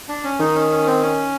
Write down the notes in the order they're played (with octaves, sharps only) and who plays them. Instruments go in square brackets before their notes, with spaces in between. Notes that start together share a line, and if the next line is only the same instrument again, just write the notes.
[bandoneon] D4
C#4
[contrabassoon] D#3 [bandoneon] D#4
[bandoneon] C#4
C#4
C4
C#4